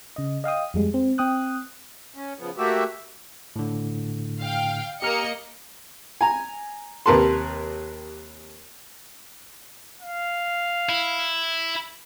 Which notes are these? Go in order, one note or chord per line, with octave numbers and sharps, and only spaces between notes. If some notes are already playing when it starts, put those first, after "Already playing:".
C#3 D#5
D#5 F5 G5 D#6
F2 G3 G#3
C4
C4 G5 D#6 F#6
C#4
C#3 F3 B3
A3 A#3 F#4 G4 E5
A2 D3
F5 G5
A#3 G4 D#5 F6 C#7
G#5 A#5
D#2 C3 A#4 B4 A5 C6
F5
E4